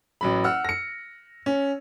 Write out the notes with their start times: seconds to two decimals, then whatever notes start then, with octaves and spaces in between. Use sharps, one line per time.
0.21 A1 F#3 B5
0.44 F#5 E6 F6
0.65 A#6 C#7
1.46 C#4